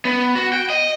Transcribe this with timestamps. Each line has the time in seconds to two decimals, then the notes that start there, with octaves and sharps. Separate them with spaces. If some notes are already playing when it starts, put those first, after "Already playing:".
0.05 B3
0.35 F#4
0.53 G5
0.70 D#5